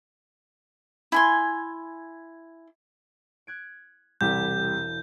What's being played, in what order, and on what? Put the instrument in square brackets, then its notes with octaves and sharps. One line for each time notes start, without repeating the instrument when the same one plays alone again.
[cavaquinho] E4 G#5 C6
[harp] F#6 G#6 D7
[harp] E1 E4 G#6 [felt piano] C2 G4 [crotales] G6